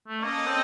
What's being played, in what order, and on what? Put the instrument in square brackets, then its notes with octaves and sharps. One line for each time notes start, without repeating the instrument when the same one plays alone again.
[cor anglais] A3
[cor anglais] A#3 [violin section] C#4 A4 D#5 A5
[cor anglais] C4